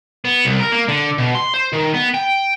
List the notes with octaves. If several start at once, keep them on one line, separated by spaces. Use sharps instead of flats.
B3
C2
A#4
A#3
D3
B2
C6
C5
D#3
B3
G5